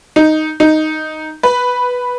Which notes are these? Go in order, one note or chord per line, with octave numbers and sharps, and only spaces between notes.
D#4
D#4
B4